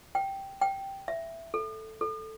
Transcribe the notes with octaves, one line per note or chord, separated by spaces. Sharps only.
G5
G5
E5
A4
A4